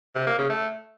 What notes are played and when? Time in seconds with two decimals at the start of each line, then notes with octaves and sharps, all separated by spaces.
0.16 C3
0.27 A#3
0.38 C#3
0.50 A3